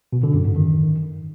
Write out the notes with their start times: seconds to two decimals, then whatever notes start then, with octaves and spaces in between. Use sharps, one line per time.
0.13 B2
0.23 D3
0.34 F#2
0.45 G#2
0.56 D#3